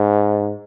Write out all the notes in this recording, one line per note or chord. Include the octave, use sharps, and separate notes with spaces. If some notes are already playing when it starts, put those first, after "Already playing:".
Already playing: G#2